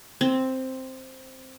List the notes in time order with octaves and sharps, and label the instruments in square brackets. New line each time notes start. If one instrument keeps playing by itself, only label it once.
[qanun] C4